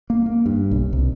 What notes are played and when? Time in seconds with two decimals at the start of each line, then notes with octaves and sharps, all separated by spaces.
0.10 A#3
0.26 A#3
0.46 G2
0.71 B1
0.93 C2